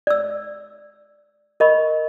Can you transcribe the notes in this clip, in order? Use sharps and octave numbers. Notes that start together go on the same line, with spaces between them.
D5 E6
A#4 D#5 B5 C#6